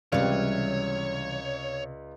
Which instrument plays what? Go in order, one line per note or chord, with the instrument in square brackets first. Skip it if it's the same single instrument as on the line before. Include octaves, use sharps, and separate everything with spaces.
[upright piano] C#2 D5 F5 [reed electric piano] C3 F6 [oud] E3 G3 [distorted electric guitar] C#5